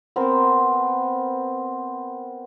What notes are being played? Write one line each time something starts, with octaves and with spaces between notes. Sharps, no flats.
B3 C4 A#4 C5